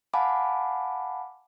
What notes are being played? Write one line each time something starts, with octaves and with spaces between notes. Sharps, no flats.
F5 F#5 G#5 A5 B5 D6